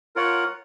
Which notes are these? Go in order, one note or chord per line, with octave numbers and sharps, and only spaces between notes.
F4 A#4 C#5 F#5